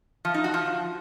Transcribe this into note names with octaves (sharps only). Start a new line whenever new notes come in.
F3
D#4
F#4
F3